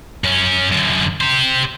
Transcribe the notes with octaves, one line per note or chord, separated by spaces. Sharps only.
F#2 C#4
F#2 D3
G4 C5